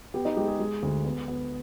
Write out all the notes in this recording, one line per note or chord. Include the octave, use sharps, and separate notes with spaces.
B3 G4
D#4
G#3 G4
G#4
G#3
D2
B3
B3